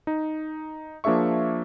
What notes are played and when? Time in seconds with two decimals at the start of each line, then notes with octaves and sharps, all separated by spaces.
0.07 D#4
1.04 F3 A#3 D4 G#4 E5 C#6